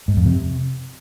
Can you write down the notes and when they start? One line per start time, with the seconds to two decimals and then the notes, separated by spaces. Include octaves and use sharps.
0.08 G#2
0.17 F2
0.26 C3